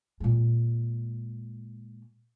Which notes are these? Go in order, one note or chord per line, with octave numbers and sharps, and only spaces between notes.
A#2 G#3